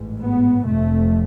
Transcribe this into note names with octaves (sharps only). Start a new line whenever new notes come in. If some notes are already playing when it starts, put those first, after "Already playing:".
Already playing: A1 G#2
B3
F1 F2 C3 A3